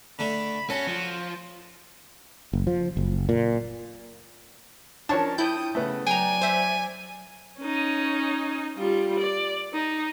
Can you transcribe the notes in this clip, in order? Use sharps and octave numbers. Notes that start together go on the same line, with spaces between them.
D3 A3 B5
C#4 F#4 A4
F3
F#1
F3
F#1
A#2
F3 C#4 D4 A#4 C#5 A5
E4 G5 D#6 G6
C#3 A3 B3
F#3 D5 G5 G#5 A#5
C5 E5
C#4 D#4
G3 F4
D5
D#4